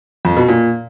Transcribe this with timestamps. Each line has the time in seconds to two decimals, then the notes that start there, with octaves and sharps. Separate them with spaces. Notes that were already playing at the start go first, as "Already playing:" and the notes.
0.25 F2
0.37 B2
0.48 A#2